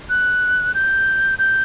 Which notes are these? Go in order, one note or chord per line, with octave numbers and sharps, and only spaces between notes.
F#6
G6
G6